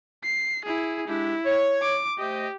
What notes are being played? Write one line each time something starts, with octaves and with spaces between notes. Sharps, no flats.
C7
E4 G#4
G#3 D4 E4 G4
C#5
D6
A3 G4 C5 D#5